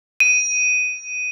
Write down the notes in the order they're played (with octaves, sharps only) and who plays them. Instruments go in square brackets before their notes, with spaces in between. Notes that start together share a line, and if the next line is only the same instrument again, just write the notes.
[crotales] D#7